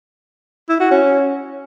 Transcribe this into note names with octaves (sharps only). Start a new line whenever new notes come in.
E4
F#4
C#4